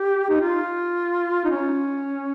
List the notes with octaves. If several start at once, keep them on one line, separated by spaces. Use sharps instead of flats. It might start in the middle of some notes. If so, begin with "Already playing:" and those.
Already playing: G4
D#4
F4
D#4
C#4